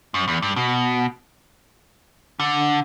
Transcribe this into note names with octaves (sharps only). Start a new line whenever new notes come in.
F#2
E2
G2
B2
D3